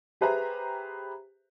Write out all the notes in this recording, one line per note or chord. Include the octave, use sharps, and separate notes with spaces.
G4 G#4 B4 C5 E5 A#5